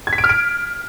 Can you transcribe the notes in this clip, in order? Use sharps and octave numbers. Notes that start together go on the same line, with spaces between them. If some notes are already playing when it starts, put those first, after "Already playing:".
G#6
B6
D7
F6
D7